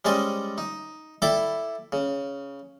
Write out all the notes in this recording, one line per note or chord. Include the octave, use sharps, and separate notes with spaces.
G3 G#3 C#4 C5 D5 D#5
D#4
E4 A4 D5 G5 B5 D6
C#3